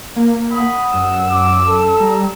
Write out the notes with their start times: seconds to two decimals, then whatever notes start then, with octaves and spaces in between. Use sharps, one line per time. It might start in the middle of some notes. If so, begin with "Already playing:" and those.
0.16 A#3
0.52 F#5 B5 D#6
0.94 F#2 E6
1.30 D6
1.67 A4
2.00 G3 A#5